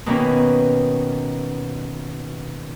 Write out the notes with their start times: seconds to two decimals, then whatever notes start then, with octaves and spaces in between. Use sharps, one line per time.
0.06 B2 D#3 A#3 B3 C#4